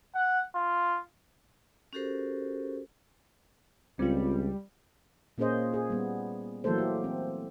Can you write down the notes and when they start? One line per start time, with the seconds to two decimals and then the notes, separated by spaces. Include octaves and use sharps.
0.15 F#5
0.55 F4
1.93 C#4 F#4 G4 A4 A#4 C5
3.99 C#2 G3 C4 F4
5.38 A#2 A#3 C#4 G#4 C5 D#5
5.74 G#4
5.90 G3 B3
6.64 E3 F#3 A3 A#3 A4 C5
6.78 G4
7.04 C4